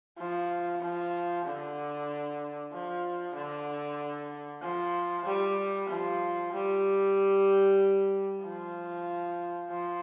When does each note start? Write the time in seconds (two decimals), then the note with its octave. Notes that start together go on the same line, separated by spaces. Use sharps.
0.18 F3
0.82 F3
1.45 D3
2.73 F3
3.35 D3
4.62 F3
5.26 G3
5.89 F3
6.52 G3
8.42 F3
9.70 F3